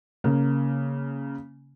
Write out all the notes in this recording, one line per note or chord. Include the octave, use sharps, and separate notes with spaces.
C#3 A#3